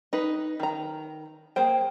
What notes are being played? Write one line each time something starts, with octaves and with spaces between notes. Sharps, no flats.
D#4 B4
D#3 A#5
A#3 G#4 C5 G5